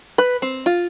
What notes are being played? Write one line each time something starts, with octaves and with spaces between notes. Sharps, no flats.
B4
C4
F4